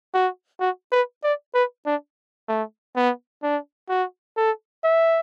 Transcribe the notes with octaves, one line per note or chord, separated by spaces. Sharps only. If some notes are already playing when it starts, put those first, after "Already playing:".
F#4
F#4
B4
D5
B4
D4
A3
B3
D4
F#4
A4
E5